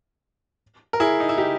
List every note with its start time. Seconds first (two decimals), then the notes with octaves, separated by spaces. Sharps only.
0.93 A#4
1.00 E4 G#4
1.20 D#4
1.29 E4
1.38 D#4 G4